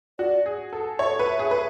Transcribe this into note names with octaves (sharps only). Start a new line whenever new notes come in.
F#4 D5
G#4
A4
C#5 E5
B4
G#4
B4